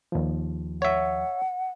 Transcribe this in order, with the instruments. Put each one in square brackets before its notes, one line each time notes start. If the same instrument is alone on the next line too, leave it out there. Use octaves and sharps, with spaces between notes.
[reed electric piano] D#2 F3
[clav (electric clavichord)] C#5 E5 [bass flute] F#5